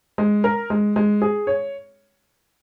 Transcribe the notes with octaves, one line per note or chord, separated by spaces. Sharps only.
G#3
A#4
G#3
G#3
G#4
C#5